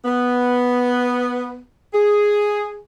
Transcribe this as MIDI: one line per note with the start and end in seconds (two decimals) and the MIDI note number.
0.05 1.61 59
1.93 2.77 68